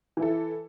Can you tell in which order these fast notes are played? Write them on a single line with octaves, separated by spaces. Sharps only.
E3 E4 A4